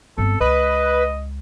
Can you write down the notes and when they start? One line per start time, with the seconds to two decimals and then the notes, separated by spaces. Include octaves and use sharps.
0.18 G1 C4 A4
0.41 C#2 B4 D#5